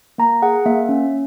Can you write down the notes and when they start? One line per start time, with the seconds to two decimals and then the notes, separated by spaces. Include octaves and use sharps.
0.18 A#3 A#5
0.42 G#4 F#5
0.66 A#3 E5
0.89 C#4